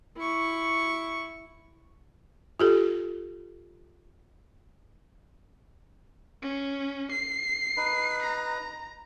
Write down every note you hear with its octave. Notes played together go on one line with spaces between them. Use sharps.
E4 C#6
F4 G4 A4
C#4
C7
D#4 B4
A#5